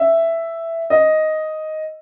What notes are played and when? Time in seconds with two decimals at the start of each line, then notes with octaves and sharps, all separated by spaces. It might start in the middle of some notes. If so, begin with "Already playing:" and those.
Already playing: E5
0.90 D#5